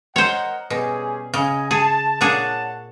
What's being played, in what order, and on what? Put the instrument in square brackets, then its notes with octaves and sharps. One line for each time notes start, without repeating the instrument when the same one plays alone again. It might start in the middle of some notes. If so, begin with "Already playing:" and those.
[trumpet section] A#4 D#5 F#5 [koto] C5 C#5
[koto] B2 [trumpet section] G3 C#4 G#4
[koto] C#3 [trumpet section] D#5 G#5
[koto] G#4 [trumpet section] A5
[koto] A#2 D4 G#4 [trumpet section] C#5 F#5 A5